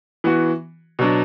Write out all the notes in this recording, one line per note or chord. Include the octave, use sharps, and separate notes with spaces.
E3 B3 F#4
B2 F#3 D4